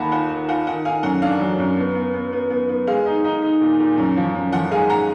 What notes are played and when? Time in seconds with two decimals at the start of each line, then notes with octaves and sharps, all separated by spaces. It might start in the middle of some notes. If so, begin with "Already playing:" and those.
Already playing: D#2 D#3 A#3 F#5 B5
0.12 F4 F#5
0.29 D#3
0.48 F4 F#5
0.66 D#3 F#5
0.84 D#3 F5 G#5
1.03 F#2 F#5
1.22 D4 F5
1.40 F#3
1.58 F#2
1.77 B3
1.95 B3
2.14 B3
2.33 B3
2.50 B3
2.69 B3
2.87 G#3 F5
3.06 D#4
3.24 D#4
3.42 D#4
3.61 A#2
3.80 A#2
3.98 F#2
4.16 F3
4.35 F#2
4.52 F3 F#5
4.71 G#3 F5 G#5
4.90 F#5 A#5